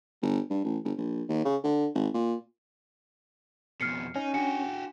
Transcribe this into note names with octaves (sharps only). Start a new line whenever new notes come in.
G1
G2
A1
G1
A#1
D#2
C#3
D3
G#1
A#2
F2 B2 F6 C7 C#7
C#4 D#4
D4 F#4 G4 G#5 C#7